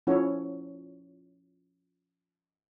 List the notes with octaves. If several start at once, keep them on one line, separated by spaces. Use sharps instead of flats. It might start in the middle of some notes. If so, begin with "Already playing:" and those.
F3 C#4 E4 F#4 A4 C#5